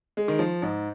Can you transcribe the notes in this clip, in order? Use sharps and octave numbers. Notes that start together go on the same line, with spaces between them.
G#3
D#3
F3
G#2